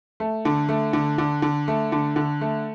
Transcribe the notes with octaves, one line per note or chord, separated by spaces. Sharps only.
A3
D3
A3
D3
D3
D3
A3
D3
D3
A3